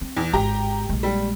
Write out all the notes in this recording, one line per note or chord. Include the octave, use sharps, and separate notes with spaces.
C4
E2
G#1 G4 A#5
A#1 G#3
G3